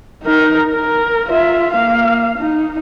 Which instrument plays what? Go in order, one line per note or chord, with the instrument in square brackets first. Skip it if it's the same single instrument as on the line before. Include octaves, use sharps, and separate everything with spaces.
[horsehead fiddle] D#4 A#4
A#4
F4 E5
A#3 F5
D#4